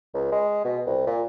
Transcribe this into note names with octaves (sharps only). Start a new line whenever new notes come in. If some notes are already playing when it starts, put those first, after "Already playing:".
C#2
G#3
B2
C2
A#2